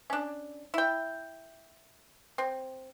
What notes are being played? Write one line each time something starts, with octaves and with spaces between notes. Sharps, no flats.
C#4 D4
E4 G5
C4